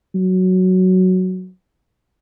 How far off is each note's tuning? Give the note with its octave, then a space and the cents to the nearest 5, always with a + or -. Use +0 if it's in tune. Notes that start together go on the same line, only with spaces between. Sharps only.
F#3 +0